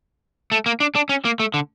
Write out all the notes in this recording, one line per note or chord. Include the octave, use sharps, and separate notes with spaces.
A3
A#3
D4
D4
C#4
A#3
A3
D3